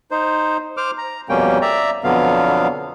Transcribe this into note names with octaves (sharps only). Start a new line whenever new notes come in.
D#4 C5
C5 D6 F6
A#5
F2 B2 G3 A#3 C#4 G5
D5 E5 A#5
F2 B2 D3 F#3 B3 F5